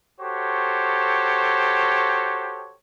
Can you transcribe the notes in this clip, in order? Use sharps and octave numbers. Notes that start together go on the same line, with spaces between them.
F#4 G4 A4 C5 C#5